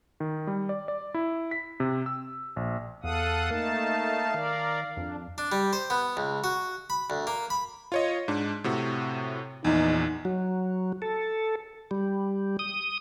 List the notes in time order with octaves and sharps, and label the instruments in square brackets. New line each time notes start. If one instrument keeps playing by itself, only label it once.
[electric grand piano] D#3
G3
D5
D5
E4
B6
C3
E6
A#1
[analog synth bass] E2 [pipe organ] A4 F#5 D#6 [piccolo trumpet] F5
[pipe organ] A3 D#4 A5 [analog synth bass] A#3
[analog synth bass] D#3 [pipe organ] A#4 D5
[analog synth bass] F2 [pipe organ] D4
[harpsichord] D4
G3
C5
B3
C#2
F#4
B5
D2
A#3
B5
[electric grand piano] F4 C#5 D#5
G#2 D4
A2 C3 F#4
[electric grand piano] A#1 E2 [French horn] D#4
[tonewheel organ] F#3
A4
G3
D#6